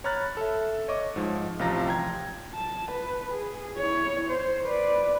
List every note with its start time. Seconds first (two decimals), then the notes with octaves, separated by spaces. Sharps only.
0.04 C#5 A#5 B5 F6 F#6 A6
0.37 A4 E5
0.88 C#5 D#5 C#6 D6
1.16 G#2 F3
1.59 A1 C3 F3 F4 A#5 A#6
1.87 G5 A#5 G#6
2.54 A5
2.91 B4
3.31 G#4
3.78 E4 C#5
4.30 C5
4.64 B4 D5